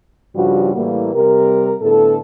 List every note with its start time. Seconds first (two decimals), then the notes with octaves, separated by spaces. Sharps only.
0.36 G2 C#3 F3 G3 F#4
0.75 A2 E3 G3 A#3
1.14 C3 G3 G4 A#4
1.82 A2 D3 B3 A4